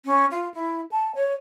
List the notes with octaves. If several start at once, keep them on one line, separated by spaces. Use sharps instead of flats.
C#4
F4
E4
A5
C#5